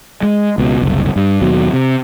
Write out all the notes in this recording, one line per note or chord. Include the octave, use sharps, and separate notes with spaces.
G#3
C#2 B2
F#1 C2
G2
D#2 B2 F#3
C3